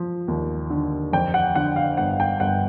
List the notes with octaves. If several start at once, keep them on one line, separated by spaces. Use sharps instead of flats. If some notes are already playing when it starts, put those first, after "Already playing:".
Already playing: F3
D#2
D3
F2 G5
F#5
D3 F#5
F5
G1 F#5
G5
G1 F#5